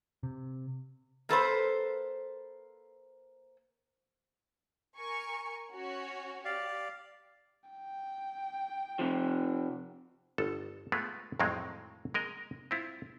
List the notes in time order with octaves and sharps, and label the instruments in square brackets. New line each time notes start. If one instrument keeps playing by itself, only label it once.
[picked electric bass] C3
[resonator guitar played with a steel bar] A#3 A4 B4 C5
[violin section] A#4 G#5 C#6
C#4 F#4 C#5
[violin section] G4 [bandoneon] D5 F5
[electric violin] G5
[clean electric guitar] C3 F3
[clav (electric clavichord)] G1 A4
G#3 A3 B3 F4
F2 A2 D#3 F#3 G#3 C4
G#3 A#4 D#5
C4 E4 F4